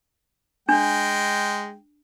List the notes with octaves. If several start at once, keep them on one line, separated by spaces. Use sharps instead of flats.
G#3 D4 G5